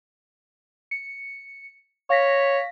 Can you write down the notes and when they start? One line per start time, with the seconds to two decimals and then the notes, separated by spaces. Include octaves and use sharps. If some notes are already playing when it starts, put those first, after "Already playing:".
0.91 C#7
2.10 C#5 F5 A#6 B6